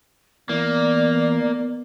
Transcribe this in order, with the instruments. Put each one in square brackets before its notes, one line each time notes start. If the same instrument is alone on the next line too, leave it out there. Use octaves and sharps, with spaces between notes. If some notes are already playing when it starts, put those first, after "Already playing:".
[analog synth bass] E3 [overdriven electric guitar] A#3 [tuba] B3 [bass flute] D5